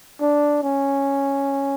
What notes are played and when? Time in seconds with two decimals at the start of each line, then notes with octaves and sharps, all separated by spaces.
0.21 D4
0.63 C#4